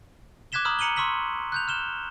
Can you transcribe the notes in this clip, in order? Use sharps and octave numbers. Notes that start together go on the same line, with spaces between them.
D6 F#6 G#6 B6 E7 G7
A#5 B5 D6 D#6 F6
A#5 C#7 D#7 F#7 G7
C6 C#6 E6 B6 F#7
F#6 G6 F7
F6 E7 G7